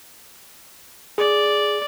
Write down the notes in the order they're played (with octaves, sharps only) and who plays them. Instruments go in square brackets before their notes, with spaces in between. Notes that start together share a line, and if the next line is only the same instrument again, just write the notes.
[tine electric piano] G#4 [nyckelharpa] D5